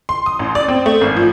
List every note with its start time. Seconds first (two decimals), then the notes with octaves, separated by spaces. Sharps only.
0.09 C6
0.26 D#6
0.39 A1
0.55 D5
0.68 C4
0.86 A3
1.01 G#1
1.17 F3